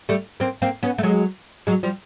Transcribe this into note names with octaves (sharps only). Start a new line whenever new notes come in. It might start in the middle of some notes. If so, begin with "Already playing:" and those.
G3 A3
A#3 C4
A#3 C4
B3 C#4
A3
F#3 G#3
F#3 G#3
F3 G3